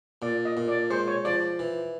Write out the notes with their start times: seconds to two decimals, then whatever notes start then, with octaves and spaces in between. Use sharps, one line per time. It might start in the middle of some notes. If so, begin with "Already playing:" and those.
0.22 A#2 D5
0.45 D#5
0.57 A#2
0.68 D5
0.90 G#3 C5
1.08 C#5
1.25 F3 D5
1.59 E3